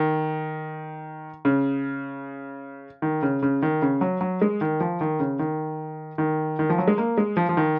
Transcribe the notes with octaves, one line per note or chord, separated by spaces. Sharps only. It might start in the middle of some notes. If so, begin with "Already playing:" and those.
Already playing: D#3
C#3
D#3
C#3
C#3
D#3
C#3
F#3
F#3
G#3
D#3
F3
D#3
C#3
D#3
D#3
D#3
F3
F#3
G#3
A#3
G#3
F3
F3
D#3